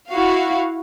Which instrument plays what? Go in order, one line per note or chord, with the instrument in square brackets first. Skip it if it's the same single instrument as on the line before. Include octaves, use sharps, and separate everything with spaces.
[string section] E4 F#4 F5